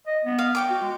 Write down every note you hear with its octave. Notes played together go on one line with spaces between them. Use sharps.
D#5
B3
F5
C#5 G5 D6
F#4
G#3